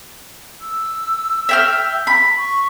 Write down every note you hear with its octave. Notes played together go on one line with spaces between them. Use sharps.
E6
E5 G5 F6
B5
C#6